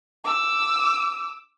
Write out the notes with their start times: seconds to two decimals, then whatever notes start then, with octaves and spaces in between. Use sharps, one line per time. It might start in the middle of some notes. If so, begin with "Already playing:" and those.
0.25 D6 E6